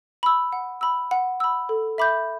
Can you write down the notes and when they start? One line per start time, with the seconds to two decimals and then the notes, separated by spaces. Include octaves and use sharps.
0.23 B5 E6
0.53 F#5
0.81 B5 E6
1.11 F#5
1.40 B5 E6
1.69 A4
1.98 E5 B5 D6 G6